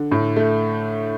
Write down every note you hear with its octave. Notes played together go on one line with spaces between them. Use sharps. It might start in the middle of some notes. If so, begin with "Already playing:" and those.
Already playing: D3
A2
A3